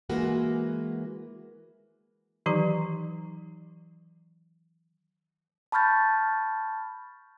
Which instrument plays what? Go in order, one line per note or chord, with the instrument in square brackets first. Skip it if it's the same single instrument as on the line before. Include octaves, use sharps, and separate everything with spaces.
[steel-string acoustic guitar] E3 G#3 A#3 F#4 B4
[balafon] D#3 E3 F#3 D#4 G4 A#5
[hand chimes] A5 B5 C#6 F6 G6 A6